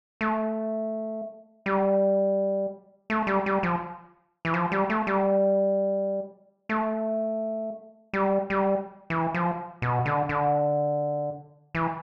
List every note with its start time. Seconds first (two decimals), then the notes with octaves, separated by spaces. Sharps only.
0.21 A3
1.66 G3
3.10 A3
3.27 G3
3.46 G3
3.63 F3
4.45 E3
4.54 F3
4.72 G3
4.90 A3
5.07 G3
6.69 A3
8.13 G3
8.50 G3
9.10 E3
9.34 F3
9.82 B2
10.05 D3
10.29 D3
11.75 E3